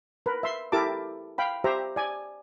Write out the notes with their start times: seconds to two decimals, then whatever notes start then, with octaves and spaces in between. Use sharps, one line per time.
0.26 A#4 B4
0.43 E5 C6
0.72 E4 G4 A4 A#4 A5 D6
1.38 F5 G5 B5
1.64 G4 C5 E5 A#5
1.96 D5 G#5